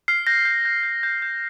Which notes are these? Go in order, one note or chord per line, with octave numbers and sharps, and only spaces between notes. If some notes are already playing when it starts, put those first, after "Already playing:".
F6 C7
G6 A#6
G6
G6
G6
G6
G6